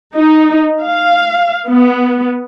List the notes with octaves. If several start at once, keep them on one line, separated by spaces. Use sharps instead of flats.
D#4
F5
B3